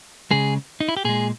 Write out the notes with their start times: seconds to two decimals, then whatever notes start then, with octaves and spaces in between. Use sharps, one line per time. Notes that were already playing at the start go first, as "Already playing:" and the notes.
0.31 C#3 G#3 G#4
0.80 D#4
0.88 E4
0.97 G4
1.05 A#2 G#3 G#4